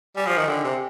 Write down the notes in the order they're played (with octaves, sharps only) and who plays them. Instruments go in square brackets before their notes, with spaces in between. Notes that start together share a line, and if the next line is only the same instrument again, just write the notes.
[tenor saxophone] G3 [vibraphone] G#5
[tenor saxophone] F3
D#3
[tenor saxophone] D3 [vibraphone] G5
[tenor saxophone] C3 [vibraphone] G5